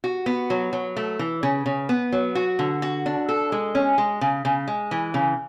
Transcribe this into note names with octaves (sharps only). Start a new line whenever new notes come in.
F#4
B3
F#3
F#3
A3
E3
C#3
C#3
B3
F#3
F#4
D3
F#4
D4
A4
G#3
C#4
G#3
C#3
C#3
G#3
E3
C#3